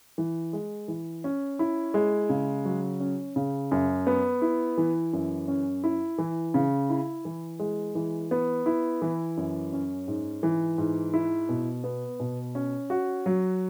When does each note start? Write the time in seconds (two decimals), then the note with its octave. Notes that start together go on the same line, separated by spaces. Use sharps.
0.18 E3
0.53 G#3
0.88 E3
1.24 C#4
1.59 E4
1.94 G#3
2.29 C#3
2.65 F#3
3.00 C#4
3.36 C#3
3.71 F#2
4.07 B3
4.42 E4
4.77 E3
5.13 F#2
5.48 C#4
5.84 E4
6.18 E3
6.54 C#3
6.90 E4
7.25 E3
7.59 G#3
7.95 E3
8.31 B3
8.66 E4
9.02 E3
9.37 F#2
9.73 C#4
10.08 G#2
10.43 E3
10.78 G#2
11.14 E4
11.49 B2
11.84 B3
12.20 B2
12.55 C#4
12.90 F#4
13.26 F#3